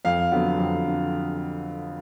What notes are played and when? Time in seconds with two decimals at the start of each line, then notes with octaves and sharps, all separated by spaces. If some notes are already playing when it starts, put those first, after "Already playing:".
0.05 F2 F5
0.32 D3 F#3 B3
0.58 F2
0.85 D3